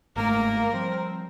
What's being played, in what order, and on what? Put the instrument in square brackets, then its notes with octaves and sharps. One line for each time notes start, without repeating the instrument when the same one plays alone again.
[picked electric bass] G1 G#2 A3 [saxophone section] A#3 [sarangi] A#4
[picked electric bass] F3 G3 [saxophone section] C4